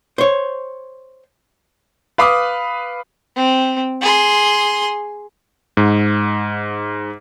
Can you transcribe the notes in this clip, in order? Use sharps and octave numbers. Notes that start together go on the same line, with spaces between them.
C5 C#5
B4 F5 B5 D6 D#6
C4
G#4 C6
G#2